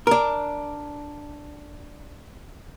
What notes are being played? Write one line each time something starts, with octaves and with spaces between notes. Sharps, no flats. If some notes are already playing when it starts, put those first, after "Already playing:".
D4 A#4